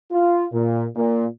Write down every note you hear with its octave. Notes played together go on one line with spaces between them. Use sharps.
F4
A#2
A#2